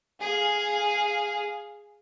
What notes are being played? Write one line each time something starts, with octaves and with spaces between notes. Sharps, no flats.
G#4 F5